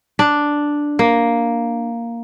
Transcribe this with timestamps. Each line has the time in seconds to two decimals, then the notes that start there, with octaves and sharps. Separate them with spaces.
0.19 D4
0.99 A#3